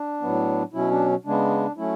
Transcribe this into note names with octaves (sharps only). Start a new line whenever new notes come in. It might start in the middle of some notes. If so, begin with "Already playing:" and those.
Already playing: D4
A2 F#3 B3
B2 F#3 C#4 E4
D4
C#3 G#3 B3 D4
F#3 A3 C#4 E4